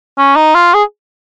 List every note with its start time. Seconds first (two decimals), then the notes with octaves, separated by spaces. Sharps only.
0.19 C#4
0.36 D#4
0.55 F4
0.74 G#4